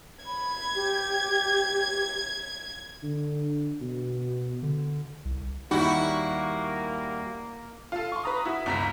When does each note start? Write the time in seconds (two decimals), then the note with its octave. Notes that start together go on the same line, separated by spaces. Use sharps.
0.26 B5 G#6
0.75 G4
3.03 D3
3.81 B2
4.63 D3
5.25 C2
5.71 D#2 G3 A#3 D#4 E4 F#4 B5
7.92 F4 A4
8.12 C6 C#6
8.24 B4 A#5 D#6
8.45 E4 F#4
8.66 G1 C#2 A#5 B6